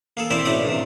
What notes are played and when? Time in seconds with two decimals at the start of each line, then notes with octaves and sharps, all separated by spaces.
0.17 A#3 G#4 A4
0.30 C4 E4 A#4 C5 D5 E5
0.45 B1 A2 C#4 D#4 D5 D#6
0.65 G2 C3